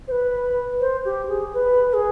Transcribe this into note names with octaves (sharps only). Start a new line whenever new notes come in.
C5
B4
C5
G4
G#4
B4
B4
G#4